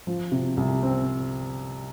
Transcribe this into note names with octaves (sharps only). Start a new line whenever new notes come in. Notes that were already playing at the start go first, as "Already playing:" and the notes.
F3
C3
C2
C4